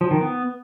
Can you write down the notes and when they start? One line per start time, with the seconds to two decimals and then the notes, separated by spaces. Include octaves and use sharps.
0.01 F3
0.11 D#3
0.21 B3